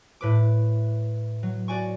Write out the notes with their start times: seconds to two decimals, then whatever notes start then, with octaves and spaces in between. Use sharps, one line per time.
0.21 A2 B4 D6
1.43 F#3
1.68 F#4 D5 G#5 C#6